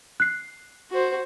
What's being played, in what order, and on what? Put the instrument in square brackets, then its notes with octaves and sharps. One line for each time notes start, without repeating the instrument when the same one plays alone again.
[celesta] F#6 C7
[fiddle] F#4 C5